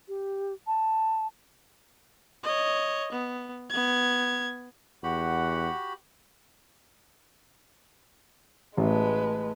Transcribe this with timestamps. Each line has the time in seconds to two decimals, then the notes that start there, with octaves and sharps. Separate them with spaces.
0.08 G4
0.67 A5
2.44 C#5 D#5
3.12 B3
3.70 B3 G#6
5.03 E2 F#4 G4 F#5 B5
8.77 A1 G#3 A3 B4 A5